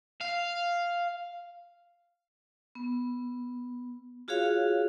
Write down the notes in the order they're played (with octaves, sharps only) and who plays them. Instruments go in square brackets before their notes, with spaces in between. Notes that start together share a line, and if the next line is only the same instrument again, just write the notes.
[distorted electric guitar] F5
[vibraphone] B3
F4 F#4 G#4 C#5 F5